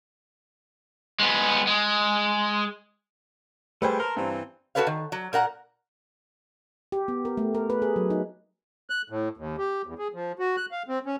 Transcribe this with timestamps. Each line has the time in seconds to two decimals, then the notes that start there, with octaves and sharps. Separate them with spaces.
1.20 G#3 B3
1.67 G#3
3.82 G3 A3 G#4 B4 C5 G5
4.00 A#4 A5 A#5 C6
4.17 G2 E3 C4
4.75 F#4 G#4 A4 B4 C#5 F5
4.87 D#3
5.12 F#3
5.33 A#2 A#4 F#5 A#5
6.92 G4
7.08 B3
7.25 A#4
7.37 A3
7.55 A#4
7.70 B4
7.82 G#4
7.96 F#3
8.10 D#4
8.90 F#6
9.10 A2
9.37 D#2
9.58 G4
9.86 E2
9.98 G#4
10.14 F3
10.39 F#4
10.57 F#6
10.72 F5
10.88 C4
11.06 C#4